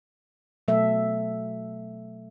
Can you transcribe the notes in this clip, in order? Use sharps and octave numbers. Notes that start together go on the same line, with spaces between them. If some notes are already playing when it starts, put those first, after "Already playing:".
B2 F#3 A3 A4 E5